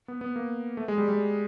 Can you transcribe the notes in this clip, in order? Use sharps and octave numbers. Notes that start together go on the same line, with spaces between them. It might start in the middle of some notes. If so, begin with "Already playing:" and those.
B3
B3
A#3
A3
G#3
G3
G3